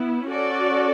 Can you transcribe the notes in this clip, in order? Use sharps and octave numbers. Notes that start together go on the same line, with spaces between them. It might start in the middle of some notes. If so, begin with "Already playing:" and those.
Already playing: B3 E4
C#4 F#4 A4 D5